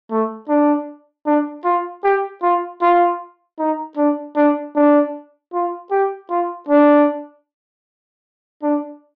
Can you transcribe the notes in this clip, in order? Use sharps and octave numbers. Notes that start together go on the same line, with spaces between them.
A3
D4
D4
F4
G4
F4
F4
D#4
D4
D4
D4
F4
G4
F4
D4
D4